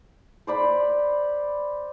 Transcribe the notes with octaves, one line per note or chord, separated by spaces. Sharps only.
C5 D5 B5